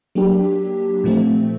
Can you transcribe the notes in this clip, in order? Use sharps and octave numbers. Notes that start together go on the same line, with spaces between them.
F#3 A#3 D4 G4
A#2 F3 A3 C4